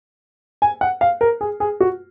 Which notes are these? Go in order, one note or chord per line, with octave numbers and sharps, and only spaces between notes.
G#5
F#5
F5
A#4
G#4
G#4
F#4